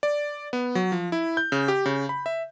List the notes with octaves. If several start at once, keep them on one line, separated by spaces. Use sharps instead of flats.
D5
B3
F#3
F3
E4
G6
C#3
G4
C#3
B5
E5